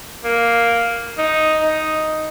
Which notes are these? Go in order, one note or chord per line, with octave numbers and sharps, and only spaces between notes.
A#3
D#4
D#4